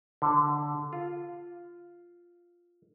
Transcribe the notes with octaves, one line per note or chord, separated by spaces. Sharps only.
D3
F4